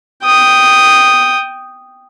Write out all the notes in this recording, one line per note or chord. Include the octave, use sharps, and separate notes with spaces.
G5 D#6